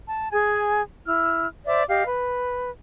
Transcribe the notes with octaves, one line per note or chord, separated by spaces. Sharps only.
A5
G#4 G#5
E4 E6 F6
C5 D5 E5 D6
G4 D#5 F5
B4